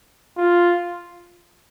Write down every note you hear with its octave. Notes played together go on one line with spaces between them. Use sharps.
F4